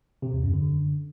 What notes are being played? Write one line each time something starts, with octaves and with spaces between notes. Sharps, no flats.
C3
E2
F#2
D3